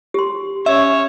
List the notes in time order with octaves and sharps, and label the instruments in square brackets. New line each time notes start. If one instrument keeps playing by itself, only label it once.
[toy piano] G4 C6
[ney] C#4 [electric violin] C#5 [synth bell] E5